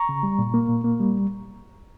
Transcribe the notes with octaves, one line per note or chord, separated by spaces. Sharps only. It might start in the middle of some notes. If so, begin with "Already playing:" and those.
Already playing: A#5 C#6
C#3
G3
A#2
A#3
A#2
A#3
G3